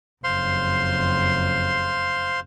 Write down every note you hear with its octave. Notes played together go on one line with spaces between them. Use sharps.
F#1 F2 C5 F5 C6